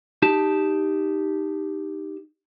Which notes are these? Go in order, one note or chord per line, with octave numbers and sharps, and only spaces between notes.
D#4 G4 A5